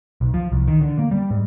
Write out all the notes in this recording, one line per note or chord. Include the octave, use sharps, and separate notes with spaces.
B1
F3
C2
D#3
D3
A#3
G3
G#2